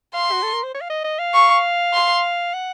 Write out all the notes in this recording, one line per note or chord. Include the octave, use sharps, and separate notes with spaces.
F5 C6
F#4
A4
A#4
C5
C#5
F5
D#5
D#5
F5
C#6
C6
F#5